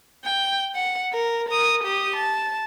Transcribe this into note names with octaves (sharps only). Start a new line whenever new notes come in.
G5
F#5
A#4
A#4 D#6
G4 D#6
A5